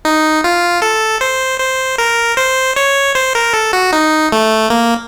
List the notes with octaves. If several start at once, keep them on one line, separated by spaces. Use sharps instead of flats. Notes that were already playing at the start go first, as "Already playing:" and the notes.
D#4
F4
A4
C5
C5
A#4
C5
C#5
C5
A#4
A4
F#4
D#4
A3
A#3